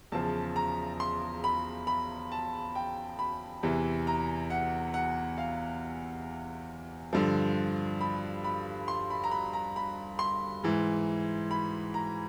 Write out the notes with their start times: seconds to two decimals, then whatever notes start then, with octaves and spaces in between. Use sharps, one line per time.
0.12 E2 C#3 F3 A5
0.56 A#5
1.00 C6
1.44 B5
1.87 B5
2.32 A5
2.75 G5
3.19 B5
3.63 E2 C3 E3
4.07 A#5
4.50 F#5
4.94 F#5
5.38 F5
7.13 G2 D3 F3
8.01 B5
8.44 B5
8.88 C6
9.10 B5
9.24 A#5
9.31 B5
9.53 A#5
9.76 B5
10.19 C6
10.63 G#2 E3
11.51 B5
11.94 A#5